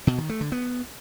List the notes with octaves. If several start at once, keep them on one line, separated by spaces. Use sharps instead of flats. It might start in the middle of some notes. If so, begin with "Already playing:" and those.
B2
D#3
A3
D3
B3